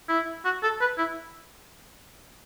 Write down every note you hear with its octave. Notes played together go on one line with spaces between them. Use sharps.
E4
F#4
A4
B4
E4